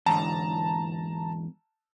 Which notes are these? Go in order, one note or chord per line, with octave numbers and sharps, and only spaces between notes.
E2 G#2 D3 A5 A#5